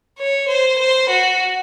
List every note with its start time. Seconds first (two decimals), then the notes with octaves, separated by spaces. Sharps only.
0.19 C#5
0.49 C5
0.79 C5
1.10 F#4